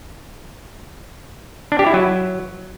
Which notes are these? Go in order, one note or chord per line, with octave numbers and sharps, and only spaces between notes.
D4
G4
E4
F#3